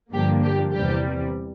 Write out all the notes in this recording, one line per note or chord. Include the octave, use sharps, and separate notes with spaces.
G2 D3 F3 A#3 D4 G4
G4
E2 C3 E3 G3 G4